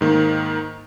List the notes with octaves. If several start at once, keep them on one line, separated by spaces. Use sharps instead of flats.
G#2 D#3 A#3